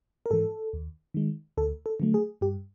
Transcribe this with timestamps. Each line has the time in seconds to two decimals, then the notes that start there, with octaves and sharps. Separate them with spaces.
0.26 A#4
0.30 G#2 E3 A4
0.73 D#2
1.14 D#3 G#3
1.57 D2 A4
1.86 A4
2.00 D3 F#3 A3
2.14 G#4
2.41 G2 G4